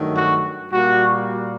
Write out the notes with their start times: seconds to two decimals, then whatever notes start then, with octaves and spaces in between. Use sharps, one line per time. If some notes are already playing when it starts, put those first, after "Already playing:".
Already playing: G2 D#3 F#3 A3
0.16 F#4
0.72 A#2 G3 A#3 F#4